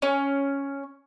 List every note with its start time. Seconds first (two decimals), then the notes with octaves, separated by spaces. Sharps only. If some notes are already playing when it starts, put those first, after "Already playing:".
0.02 C#4